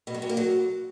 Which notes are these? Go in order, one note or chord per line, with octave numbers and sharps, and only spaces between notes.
B2
F#3
C3
A#3
F#3